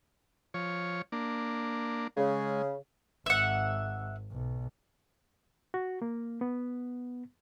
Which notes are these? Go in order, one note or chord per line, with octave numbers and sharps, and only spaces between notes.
F3 C#5
A#3 D4
C#3 G#3
G#1 E5 F#5
B1
F#4
A#3
B3